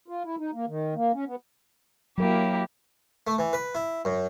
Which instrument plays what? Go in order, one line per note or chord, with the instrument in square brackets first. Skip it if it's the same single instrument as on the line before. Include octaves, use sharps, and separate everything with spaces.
[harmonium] F4
E4
D#4
A#3
D#3
A#3
C#4
B3
[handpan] F#3 A#4 [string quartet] A#3 E4 G4
[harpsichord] A3
E3
B4
E4
F#2